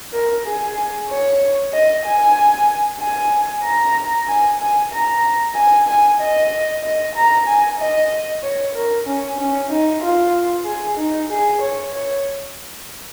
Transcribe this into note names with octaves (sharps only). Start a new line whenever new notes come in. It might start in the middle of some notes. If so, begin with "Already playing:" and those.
A#4
G#4
C#5
D#5
G#5
G#5
A#5
G#5
G#5
A#5
G#5
G#5
D#5
D#5
A#5
G#5
D#5
C#5
A#4
C#4
C#4
D#4
F4
G#4
D#4
G#4
C#5
C#5